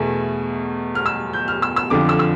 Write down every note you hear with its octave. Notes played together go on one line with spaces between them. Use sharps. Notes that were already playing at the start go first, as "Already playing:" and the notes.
Already playing: E2 B2 A3
F6
E6
G6
F6
E6
E6
F2 D3 F3 D6
E6
E6